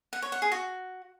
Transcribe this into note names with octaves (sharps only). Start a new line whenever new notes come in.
F#5
C#5
F#5
G#4
F#4